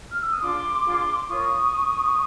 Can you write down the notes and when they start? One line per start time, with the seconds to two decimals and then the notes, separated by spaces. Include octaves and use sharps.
0.11 F6
0.20 E6
0.31 D#6
0.41 D4 F4 G#4 C6 D6
0.84 D4 F4 G#4
1.28 F4 A#4 C#5 C#6 D#6